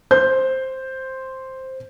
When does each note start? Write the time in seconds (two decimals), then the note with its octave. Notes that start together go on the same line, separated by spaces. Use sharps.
0.11 C5 G6